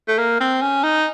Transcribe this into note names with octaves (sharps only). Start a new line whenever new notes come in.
A3
A#3
C4
C#4
D#4